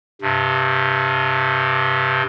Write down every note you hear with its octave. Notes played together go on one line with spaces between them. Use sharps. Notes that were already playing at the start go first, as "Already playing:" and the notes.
G2 C3